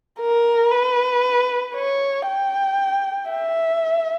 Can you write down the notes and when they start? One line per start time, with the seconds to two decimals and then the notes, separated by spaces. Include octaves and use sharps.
0.20 A#4
0.72 B4
1.75 C#5
2.28 G5
3.31 E5